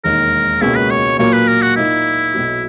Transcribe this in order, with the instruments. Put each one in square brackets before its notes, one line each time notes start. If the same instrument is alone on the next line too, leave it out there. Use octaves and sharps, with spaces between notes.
[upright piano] E1 D#2 D#3 A#3 D#4 [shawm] A#4
[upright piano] C#2 B2 A#3 C#4 G#4 [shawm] E4
[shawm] B4
C#5
[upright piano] A#2 F#3 A#3 [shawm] C#5
[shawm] B4
A#4
F#4
[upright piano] A#2 A#3 D#4 [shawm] E4
[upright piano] B1 B2 F#3